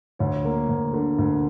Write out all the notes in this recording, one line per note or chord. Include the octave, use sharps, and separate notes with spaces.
D2 C#5
A#3
D2
D3 A#4
D2